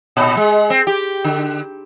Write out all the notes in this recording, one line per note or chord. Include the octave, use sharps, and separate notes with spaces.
A#2
G#3
C4
G4
D3